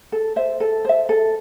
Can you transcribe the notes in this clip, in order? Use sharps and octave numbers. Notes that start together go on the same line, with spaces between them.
A4
C5 E5
A4
C5 E5
A4